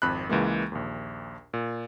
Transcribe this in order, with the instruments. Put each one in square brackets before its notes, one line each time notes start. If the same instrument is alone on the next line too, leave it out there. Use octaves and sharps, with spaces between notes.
[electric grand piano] G#1 F2 B5 F#6
C#2 E3 G#3 A#3
A#1 D#2
A#2